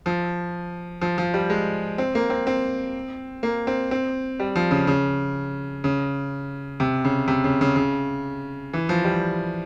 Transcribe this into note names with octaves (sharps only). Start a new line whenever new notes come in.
F3
F3
F3
G3
G#3
C4
A#3
C4
C4
A#3
C4
C4
G3
F3
C#3
C#3
C#3
C3
C#3
C3
C#3
C#3
C#3
E3
F3
G3